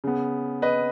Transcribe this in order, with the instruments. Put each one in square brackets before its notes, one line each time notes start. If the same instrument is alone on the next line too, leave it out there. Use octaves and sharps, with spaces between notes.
[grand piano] C#3 B3
B4 D#5